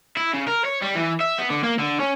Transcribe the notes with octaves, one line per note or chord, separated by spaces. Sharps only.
E4
C#3
A#4
C#5
G3
E3
E5
B3
D3
A#3
D3
C#4